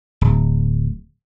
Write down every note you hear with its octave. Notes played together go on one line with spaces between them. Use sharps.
D1